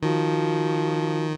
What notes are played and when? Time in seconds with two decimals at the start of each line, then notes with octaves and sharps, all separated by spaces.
0.03 D#3 F3 F#4